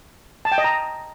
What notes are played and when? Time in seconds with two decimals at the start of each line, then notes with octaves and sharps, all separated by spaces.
0.45 A5
0.52 G5
0.58 D#5
0.64 A#5